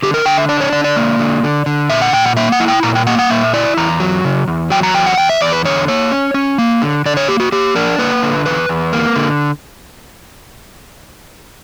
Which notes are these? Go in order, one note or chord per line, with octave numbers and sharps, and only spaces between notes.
D3 G4
A#4
D3 G5
E5
D4 D5
C#5
D3 D5
D5
A#3
D3
D3
D3
A#2 E5
F#5
A#2 G5
F#5
A#3 E5
F#5
E4
G5
A#2 A#5
G5
A#3 F#5
F#5
A#2 E5
E4 D5
E2 A#5
F#3
C#3
E2
F#3 G5
A#5
E2 G5
F#5
E2 G5
E5
E2 D5
B4
D3 C#5
A#3 C#5
C#4
C#4
A#3
D3
D3 D5
C#5
A#3 G4
F#4
A#3 G4
D4 A#4
A#3 B4
D3
E2 B4
E2
A#3
D3